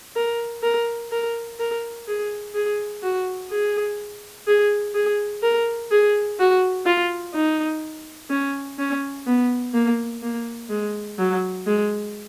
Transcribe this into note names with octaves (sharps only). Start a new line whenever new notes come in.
A#4
A#4
A#4
A#4
G#4
G#4
F#4
G#4
G#4
G#4
A#4
G#4
F#4
F4
D#4
C#4
C#4
B3
A#3
A#3
G#3
F#3
G#3